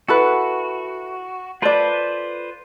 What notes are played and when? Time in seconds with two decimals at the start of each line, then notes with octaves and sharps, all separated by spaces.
0.08 E4 F#4 A4 B4
1.62 F4 A4 B4 C5 D5